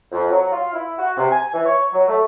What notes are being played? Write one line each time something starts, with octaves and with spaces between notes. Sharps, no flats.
F2
F#3
F4
E4
F#4
C3
G#5
E3
C#5
F#3
A3